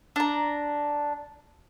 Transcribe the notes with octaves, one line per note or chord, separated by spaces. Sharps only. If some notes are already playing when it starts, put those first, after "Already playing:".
D4 A#5